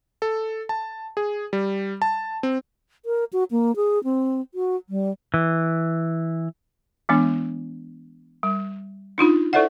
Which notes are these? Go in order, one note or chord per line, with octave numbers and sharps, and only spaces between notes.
A4
A5
G#4
G3
A5
C4
A#4
F#4
A#3
G#4
C4
F#4
G3
E3
E3 G#3 B3 D4
G3
D4 D#4 F4 B5
E4 A4 C5 D5 E5 F#5